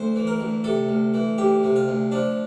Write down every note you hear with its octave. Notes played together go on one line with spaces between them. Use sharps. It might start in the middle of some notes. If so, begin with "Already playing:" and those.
Already playing: D2 C5
E3
A#4
D2
C3 A4
D2
E3
D2 G4
C3
F4
D2
F3 D4